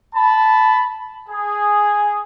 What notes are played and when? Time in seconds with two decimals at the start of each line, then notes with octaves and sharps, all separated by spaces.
0.15 A5 B5
1.29 G#4